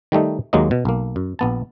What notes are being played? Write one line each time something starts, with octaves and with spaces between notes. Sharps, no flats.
D#3 G3 A3 D#4
D#2 F#3 G#3 A#3 D#5
B2
B1 A#3
F#2
A#1 B3 A5